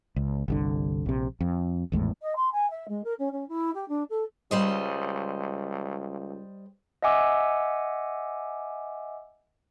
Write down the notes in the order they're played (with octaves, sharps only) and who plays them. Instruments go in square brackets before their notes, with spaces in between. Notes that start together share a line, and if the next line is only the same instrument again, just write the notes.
[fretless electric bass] C#2
G1 C2 D3
A#1 C3
F2
G#1 E2 A2 G#3
[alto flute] D#5
C6
G#5
E5
G#3
A#4
C#4
C#4
E4
G4
D4
A4
[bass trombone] C#2 [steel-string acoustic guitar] G3 C5 D#5
[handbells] D#5 E5 F#5 G#5 D6 E6